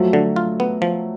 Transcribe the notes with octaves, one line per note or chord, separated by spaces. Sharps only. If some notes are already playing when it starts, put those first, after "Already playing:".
Already playing: F3 F#3 A3
D3
F4
B3
F3